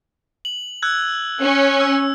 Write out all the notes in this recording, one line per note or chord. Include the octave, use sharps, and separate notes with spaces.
F#7
E6 F#6 G#6
C#4
E6